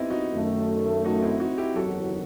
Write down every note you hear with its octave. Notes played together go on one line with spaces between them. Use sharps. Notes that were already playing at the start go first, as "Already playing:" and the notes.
Already playing: B3 C4 D#4 E4 G4 D#5
D#4 F#4
F#2 D#3 A3
D#4 F#4
C4 E4
D#4 F#4
E4 G4
F#1 E2 D#3 F#3 F#4 A4